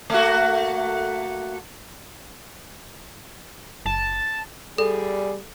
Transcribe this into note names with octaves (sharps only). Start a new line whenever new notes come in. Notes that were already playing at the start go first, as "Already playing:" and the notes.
A3 A#3 F#4
F#1 A5
G3 G#4 A4 D5